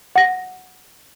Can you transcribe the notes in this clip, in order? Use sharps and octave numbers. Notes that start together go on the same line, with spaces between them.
F#5 A#6